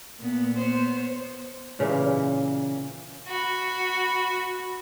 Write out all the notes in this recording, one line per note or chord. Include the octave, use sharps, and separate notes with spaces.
A#2 B3
B3 C5 C#5
A#2 C#3 E3 A#3
F#4 B5